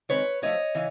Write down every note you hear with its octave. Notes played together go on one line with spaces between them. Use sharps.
D#3 G#3 C4 B4 C#5
F3 A3 D4 C#5 D#5
C#3 E3